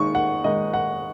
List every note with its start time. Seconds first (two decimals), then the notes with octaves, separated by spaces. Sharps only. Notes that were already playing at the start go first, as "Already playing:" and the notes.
Already playing: D#3 G#3 D#4 C#6
0.15 F#5
0.44 D#3 G#3 D#4 D#5
0.74 F#5